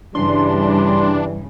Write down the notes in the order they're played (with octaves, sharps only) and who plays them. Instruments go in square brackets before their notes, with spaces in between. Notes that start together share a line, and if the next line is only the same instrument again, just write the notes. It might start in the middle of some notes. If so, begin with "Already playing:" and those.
[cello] G2 C#3 [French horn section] E3 G3 [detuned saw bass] D4 [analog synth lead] C6